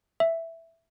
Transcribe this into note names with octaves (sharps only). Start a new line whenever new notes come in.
E5